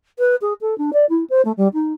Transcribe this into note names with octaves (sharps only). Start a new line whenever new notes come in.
B4
G#4
A4
D4
D5
E4
C5
A3
G3
D#4